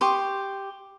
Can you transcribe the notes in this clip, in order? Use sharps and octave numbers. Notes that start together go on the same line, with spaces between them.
G4 C6 C#6 D#6